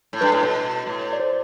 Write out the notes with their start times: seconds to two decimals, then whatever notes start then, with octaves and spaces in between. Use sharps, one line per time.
0.13 A2
0.21 G2 B4
0.32 A2
0.43 B2
0.87 A2
1.13 D5
1.20 C5